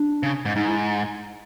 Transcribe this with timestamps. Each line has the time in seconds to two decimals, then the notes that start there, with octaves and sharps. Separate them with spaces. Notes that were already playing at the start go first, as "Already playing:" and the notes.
Already playing: D4
0.23 C#3
0.45 G#2
0.56 G#2 D#4
0.67 E4